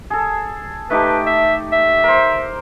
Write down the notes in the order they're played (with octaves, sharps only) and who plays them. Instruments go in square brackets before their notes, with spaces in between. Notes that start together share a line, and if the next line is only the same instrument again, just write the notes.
[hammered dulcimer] G#4 A4
[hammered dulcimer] A3 D#4 G4 [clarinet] B4
[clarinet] E5
E5
[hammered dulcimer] A#4 C5